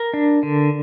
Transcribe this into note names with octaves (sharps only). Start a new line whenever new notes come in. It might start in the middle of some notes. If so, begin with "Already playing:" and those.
Already playing: A#4
D4
D3